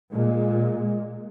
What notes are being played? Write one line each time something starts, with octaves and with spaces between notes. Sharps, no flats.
A#2 G#3